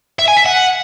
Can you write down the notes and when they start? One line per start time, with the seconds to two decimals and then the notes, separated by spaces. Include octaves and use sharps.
0.19 E5
0.28 G#5
0.37 E5
0.45 F#5